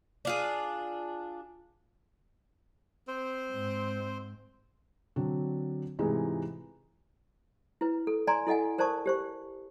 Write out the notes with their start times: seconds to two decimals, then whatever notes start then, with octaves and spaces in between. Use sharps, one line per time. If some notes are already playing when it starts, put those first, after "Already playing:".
0.25 D4 F4 G#4
3.08 C4 C5 C6
3.51 G#2
5.16 D3 F#3 C4 D4
5.99 G#2 C3 E3 G#3 D#4 F4
7.81 E4 B4
8.07 A4
8.27 D5 G#5 A#5 C6
8.47 E4 A4 D#5 F#5 G#5
8.78 A#4 C5 D5 A5 C#6 D#6
9.06 G4 C5 C#6